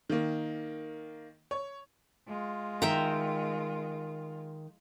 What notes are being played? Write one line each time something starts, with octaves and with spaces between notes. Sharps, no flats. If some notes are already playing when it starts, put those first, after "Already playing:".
D#3 A#3
C#5
G#3 F4
D#3 E5 G5 A#5